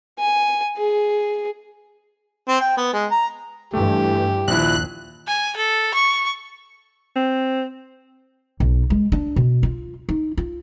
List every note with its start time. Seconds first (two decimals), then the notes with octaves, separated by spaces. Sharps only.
0.19 G#5
0.77 G#4
2.48 C4
2.61 G5
2.77 B3
2.93 G#3
3.11 A#5
3.73 G2 E3 A3 G4
4.48 A#1 D#2 F3 E4 F#6
5.27 G#5
5.57 A4
5.94 C#6
7.16 C4
8.60 B1
8.90 G#3
9.12 D4
9.36 B2
9.63 F4
10.09 D#4
10.37 F4